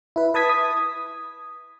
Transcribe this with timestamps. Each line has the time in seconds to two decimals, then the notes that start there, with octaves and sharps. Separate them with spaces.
0.16 E4 B4
0.34 B4 A5 D#6 G#6 B6
0.49 D#6